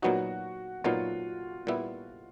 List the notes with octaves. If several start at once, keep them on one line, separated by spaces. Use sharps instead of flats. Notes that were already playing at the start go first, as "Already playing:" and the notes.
A#2 F#3 B3 D#4 F#4
A#2 F#3 B3 D#4 F4
A#2 G3 B3 E4